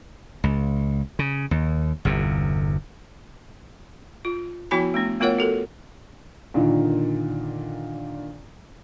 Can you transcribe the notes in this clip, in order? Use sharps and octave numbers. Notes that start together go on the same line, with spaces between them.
C#2
C#3
D#2
G1 E2 C3
F4
F3 B3 E4 F#4 G#5 B5
A3 B3 D4
A3 B3 F4 A#4 C#5 F#5
F#4 A4 A#4
A#2 D3 D#3